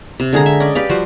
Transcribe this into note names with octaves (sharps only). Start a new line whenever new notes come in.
C3
D3 G#3 G#4 A#5
E5
C#4 D5 D#5
G4 B4 D5 F5
F3 G3 F#4 C5